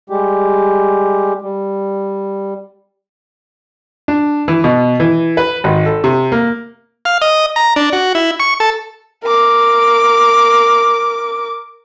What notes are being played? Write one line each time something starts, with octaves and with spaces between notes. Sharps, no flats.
G3 G#3 G4
G3
D4
E3
B2
E3
B4
G#1
A4
C3
A#3
F5
D#5
A#5
D4
F#4
E4
C#6
A4
A#4 D6